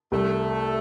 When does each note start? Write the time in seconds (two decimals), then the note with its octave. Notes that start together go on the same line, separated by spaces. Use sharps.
0.12 C2 A3